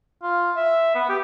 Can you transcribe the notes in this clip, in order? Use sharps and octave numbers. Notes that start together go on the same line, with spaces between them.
F4
E5
B3
G4